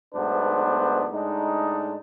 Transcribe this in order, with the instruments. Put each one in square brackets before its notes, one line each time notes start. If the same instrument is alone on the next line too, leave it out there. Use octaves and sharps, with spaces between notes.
[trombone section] B1 G#2 A3 B3 D4 C5
A2 G#3 D4 D#4